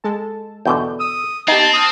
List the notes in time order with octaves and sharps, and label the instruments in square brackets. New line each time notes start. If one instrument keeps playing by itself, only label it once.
[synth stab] G#3 A4 A5
[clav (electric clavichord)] E2 B2 D3 [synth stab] G6
[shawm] D#6 [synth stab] E6
[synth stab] B3 G4 [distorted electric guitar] C4 [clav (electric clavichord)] D#4 [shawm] A5
[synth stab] A5 F6 F#6 [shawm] D#6